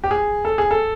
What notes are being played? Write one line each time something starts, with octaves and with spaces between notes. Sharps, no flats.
G4
G#4
A4
G#4
A4